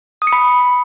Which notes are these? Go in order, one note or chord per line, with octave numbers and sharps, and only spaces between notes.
D#6
C#7
B5